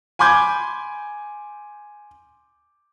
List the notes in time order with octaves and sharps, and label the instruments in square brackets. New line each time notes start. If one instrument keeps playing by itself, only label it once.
[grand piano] G#5 B5 C6 D6 G6 G#6